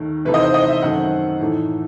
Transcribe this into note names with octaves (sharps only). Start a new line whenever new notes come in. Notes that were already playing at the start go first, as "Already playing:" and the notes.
Already playing: D#2 D#3 A3
C3 E3 A3 D#4 B4
D#5
C5
D#5
E5
F#2 D#3 A3 C4 F#5
A2 E3 A3 D#4